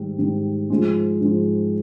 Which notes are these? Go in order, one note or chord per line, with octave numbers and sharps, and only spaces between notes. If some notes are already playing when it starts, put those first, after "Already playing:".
Already playing: G#2 D#3 G3
G#2 D#3 G3
G#2 F3 G#3
G#2 F3 G#3